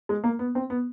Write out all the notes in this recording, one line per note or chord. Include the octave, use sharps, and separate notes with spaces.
G#3
A#3
B3
C4
B3